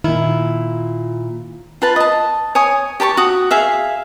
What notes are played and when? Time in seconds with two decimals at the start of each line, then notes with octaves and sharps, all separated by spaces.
0.04 A#2 D#3 E4
1.82 F4 B4 A5
1.96 D#5 A5
2.55 C#5 G#5 D#6
3.00 G4 A5 B5 C#6
3.17 F#4 D#6
3.51 G#4 E5 F5